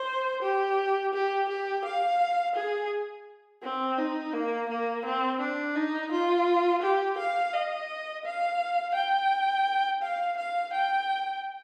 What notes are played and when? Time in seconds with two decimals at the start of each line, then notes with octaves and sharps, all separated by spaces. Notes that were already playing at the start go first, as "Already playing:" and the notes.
Already playing: C5
0.43 G4
1.14 G4
1.49 G4
1.85 F5
2.56 G#4
3.63 C4
3.98 D#4
4.33 A#3
4.69 A#3
5.05 C4
5.40 D4
5.76 D#4
6.12 F4
6.82 G4
7.18 F5
7.54 D#5
8.25 F5
8.95 G5
10.02 F5
10.37 F5
10.73 G5